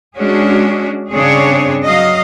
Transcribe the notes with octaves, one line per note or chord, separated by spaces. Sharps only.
G#3 C#4 D4 F#4 G#4
G2 C#3 C4 D4 G#4 C#5
F#3 D#5 F5